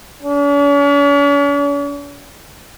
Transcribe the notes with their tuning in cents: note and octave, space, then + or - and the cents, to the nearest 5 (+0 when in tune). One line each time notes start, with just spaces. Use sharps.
C#4 +45